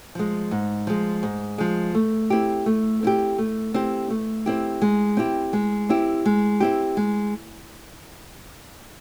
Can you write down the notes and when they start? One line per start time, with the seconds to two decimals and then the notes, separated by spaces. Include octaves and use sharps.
0.15 F3 G#3
0.51 G#2
0.87 F3 G#3
1.23 G#2
1.58 F3 G#3
1.95 A3
2.30 C4 E4 G4
2.66 A3
3.03 C4 E4 G4
3.38 A3
3.74 C4 E4 G4
4.10 A3
4.46 C4 E4 G4
4.82 G#3
5.17 C4 E4 G4
5.53 G#3
5.89 C4 E4 G4
6.25 G#3
6.60 C4 E4 G4
6.97 G#3